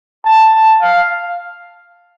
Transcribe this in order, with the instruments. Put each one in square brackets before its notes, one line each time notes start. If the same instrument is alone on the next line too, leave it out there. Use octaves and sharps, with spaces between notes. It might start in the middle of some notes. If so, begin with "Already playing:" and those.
[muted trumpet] A5
A5
F5